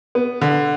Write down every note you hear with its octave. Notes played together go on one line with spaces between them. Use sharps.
B3
D3